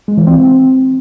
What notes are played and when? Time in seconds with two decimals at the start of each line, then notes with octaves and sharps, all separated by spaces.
0.08 G#3
0.17 E3
0.27 C4